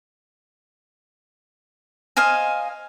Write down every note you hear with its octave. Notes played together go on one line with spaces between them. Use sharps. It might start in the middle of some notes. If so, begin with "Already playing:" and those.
C5 D#5 F5 G#5